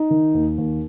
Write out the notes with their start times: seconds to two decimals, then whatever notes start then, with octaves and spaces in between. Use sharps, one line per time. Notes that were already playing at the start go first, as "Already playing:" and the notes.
Already playing: D#4
0.10 D#3
0.34 D#2
0.58 D#2